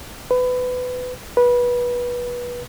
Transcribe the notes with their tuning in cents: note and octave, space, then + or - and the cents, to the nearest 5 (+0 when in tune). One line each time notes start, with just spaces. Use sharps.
B4 +25
B4 -20